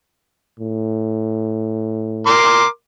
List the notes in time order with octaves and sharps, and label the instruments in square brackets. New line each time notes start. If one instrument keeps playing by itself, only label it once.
[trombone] A2
[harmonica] A#4 C6 D6